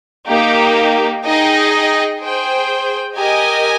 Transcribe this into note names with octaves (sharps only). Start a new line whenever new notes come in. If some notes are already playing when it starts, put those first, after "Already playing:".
A#3 D#4 G4
D#4 G#4 D#5 G5
G#4 C5 G5
G4 A#4 D#5 G#5